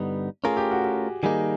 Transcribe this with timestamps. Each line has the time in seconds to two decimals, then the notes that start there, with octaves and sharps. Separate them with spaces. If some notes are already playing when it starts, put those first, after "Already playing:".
Already playing: G2 D3 G3 B3 D#4
0.44 A3 C#4 F4 G#4 A#4
0.57 G4
0.71 F#4
0.84 G4
1.23 D#3 G3 A#3 D#4 G#4